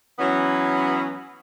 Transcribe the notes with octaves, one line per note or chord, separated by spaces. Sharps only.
E3 F#3 B3 C#4